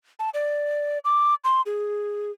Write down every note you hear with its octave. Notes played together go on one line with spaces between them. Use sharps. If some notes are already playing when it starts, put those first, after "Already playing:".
A5
D5
D6
C6
G#4